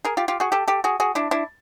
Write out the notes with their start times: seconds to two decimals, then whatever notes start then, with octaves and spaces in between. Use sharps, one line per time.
0.05 G#4 A#4
0.17 F4 G4
0.28 F4 G4
0.40 F#4 G#4
0.52 G4 A4
0.68 G4 A4
0.84 F#4 G#4
1.00 F#4 G#4
1.15 D4 E4
1.31 D4 E4